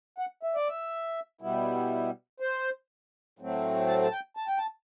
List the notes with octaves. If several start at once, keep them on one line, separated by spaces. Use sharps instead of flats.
F#5
E5
D5
E5
B2 G3 B3 E4
C5
A2 F#3 A3 C4
A5
A5
G5
A5
G5
A5